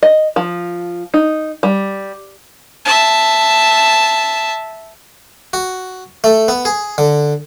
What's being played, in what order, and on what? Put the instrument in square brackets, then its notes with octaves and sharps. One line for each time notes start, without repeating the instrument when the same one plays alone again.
[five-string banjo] D#5
F3
D#4
G3
[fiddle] E5 A5
[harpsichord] F#4
A3
B3
G#4
D3